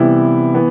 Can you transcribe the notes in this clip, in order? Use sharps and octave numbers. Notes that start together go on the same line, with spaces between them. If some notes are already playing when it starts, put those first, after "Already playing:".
Already playing: C3 E3 G3 B3 E4
E3 B3